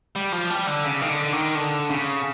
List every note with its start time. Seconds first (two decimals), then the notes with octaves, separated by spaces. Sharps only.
0.16 G3
0.32 F3
0.50 G3
0.67 D3
0.84 C#3
1.01 D#3
1.08 D3
1.32 D#3
1.55 D3
1.90 C#3